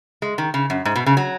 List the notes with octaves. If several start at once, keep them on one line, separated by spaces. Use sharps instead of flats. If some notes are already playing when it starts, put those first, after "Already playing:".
G#3
D#3
C#3
F#2
G#2
B2
C#3
F#3